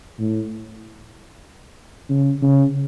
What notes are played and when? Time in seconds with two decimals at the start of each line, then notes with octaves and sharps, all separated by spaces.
0.18 A2
2.10 C#3
2.42 C#3